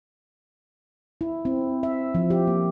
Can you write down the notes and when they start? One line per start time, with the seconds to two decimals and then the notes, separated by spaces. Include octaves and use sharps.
1.21 E4
1.45 C4
1.83 E5
2.15 F3
2.30 G4
2.47 A#3